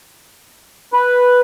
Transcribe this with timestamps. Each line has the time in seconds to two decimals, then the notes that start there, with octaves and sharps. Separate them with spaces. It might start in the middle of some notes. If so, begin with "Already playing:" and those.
0.93 B4